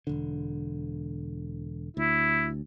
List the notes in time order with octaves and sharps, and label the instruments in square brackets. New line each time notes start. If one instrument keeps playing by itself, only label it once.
[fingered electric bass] E1 D3
[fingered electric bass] D2 [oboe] E4